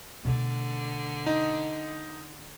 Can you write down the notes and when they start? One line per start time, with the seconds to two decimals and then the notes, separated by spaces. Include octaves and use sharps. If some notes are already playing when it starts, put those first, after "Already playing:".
0.25 B2 D3 A3
1.26 D#4